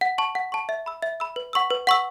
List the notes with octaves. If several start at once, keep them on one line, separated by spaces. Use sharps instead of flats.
F#5
A5 C#6
F#5
A5 C#6
E5
B5 E6
E5
B5 E6
B4
F#5 C#6 E6
B4
F#5 C#6 E6